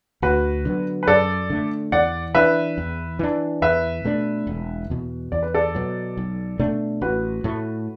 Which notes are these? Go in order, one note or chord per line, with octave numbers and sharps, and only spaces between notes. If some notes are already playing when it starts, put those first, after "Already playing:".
D2 F#4 B4
D3 F#3 B3
B4
F#2 A4 D5
D3 A3
E2 D5 F#5
E3 D4 B4 E5
E2
E3 D4
E2 B4 E5
B2 A3 D4
E1
E2 B2
E2 D5
B4
A4 D5
B2 F#3
B1
B2 A3 D4
A1 F#4 B4
A2 A3